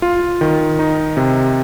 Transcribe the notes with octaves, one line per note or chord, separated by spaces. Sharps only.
F4
D#3
D#4
C3